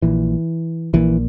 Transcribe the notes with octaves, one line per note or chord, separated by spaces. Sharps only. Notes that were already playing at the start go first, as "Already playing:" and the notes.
A#1 A#2 E3
A#1 A#2 E3